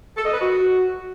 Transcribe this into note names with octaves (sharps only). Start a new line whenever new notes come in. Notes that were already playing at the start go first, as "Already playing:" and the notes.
A4
D#5
B4
F#4